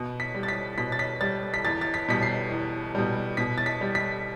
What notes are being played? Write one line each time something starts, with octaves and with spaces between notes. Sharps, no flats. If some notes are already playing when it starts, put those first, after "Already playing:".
Already playing: B2
B6
G3
A6
B6
B2 B6
A6
B6
G3 A6
B6
E2 A6
A6
B6
B2 G3 B6
C7
E2
B2 G3
B2 B6
A6
B6
G3
B6